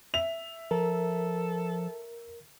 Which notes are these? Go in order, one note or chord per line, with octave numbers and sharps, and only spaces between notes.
E5 F7
F3 A4 A#4